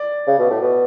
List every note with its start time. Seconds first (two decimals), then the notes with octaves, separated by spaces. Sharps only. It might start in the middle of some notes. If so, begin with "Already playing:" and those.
Already playing: D5
0.27 C#3
0.39 B2
0.51 A2
0.61 B2